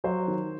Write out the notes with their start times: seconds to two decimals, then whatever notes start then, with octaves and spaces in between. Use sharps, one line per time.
0.04 F#3 C5
0.28 D#3